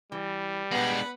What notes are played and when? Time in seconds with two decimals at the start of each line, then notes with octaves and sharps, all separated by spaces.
0.12 E3 G3
0.71 G#3 B3 D4 B4 F#5 B5